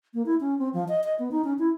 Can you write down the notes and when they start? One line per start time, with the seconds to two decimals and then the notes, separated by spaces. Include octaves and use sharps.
0.14 A#3
0.26 E4
0.40 C#4
0.59 C4
0.73 F3
0.88 D#5
1.04 D#5
1.19 B3
1.31 D#4
1.44 C#4
1.59 E4